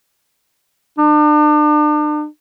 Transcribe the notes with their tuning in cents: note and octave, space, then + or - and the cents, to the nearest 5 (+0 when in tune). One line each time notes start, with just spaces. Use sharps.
D4 +40